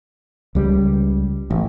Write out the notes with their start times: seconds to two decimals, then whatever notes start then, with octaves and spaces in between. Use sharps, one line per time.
0.55 C#2 G3
1.51 A1